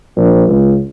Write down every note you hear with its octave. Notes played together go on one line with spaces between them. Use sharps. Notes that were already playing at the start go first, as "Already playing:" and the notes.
A#1
C#2